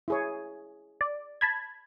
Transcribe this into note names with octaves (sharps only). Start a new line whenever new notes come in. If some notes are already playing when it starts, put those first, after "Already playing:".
E4 G#4 C#5
D5
A5 B5 G#6